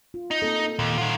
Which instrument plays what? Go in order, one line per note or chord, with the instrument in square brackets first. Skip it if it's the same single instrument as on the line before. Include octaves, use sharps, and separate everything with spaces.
[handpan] F4
[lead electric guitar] D#4
[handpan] A#3 C4 A4
[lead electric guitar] D#2 [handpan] A#2
[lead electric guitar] D#3 F4 [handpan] F#5